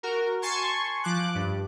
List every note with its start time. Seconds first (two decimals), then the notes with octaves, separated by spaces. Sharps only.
0.03 F#4 A#4
0.42 G#5 A5 C6 C#6 G#6
1.04 F3 D6 F#6
1.35 G2